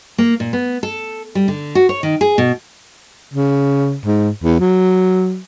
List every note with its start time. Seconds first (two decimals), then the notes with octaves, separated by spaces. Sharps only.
0.18 A#3
0.40 A#2
0.53 B3
0.83 A4
1.35 G3
1.48 D3
1.75 F#4
1.89 C#5
2.03 D#3
2.21 G#4
2.38 B2
3.34 C#3
4.06 G#2
4.44 E2
4.60 F#3